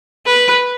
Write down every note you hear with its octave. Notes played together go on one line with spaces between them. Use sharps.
B4